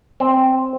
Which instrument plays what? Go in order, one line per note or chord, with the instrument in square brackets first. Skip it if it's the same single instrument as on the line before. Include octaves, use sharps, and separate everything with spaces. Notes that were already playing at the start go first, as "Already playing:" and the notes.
[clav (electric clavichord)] C4